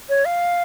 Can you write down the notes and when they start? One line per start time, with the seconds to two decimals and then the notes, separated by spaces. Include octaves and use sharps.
0.09 C#5
0.25 F5